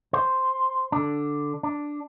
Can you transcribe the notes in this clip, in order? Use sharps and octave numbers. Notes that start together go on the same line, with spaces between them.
C5
D3 D4
D4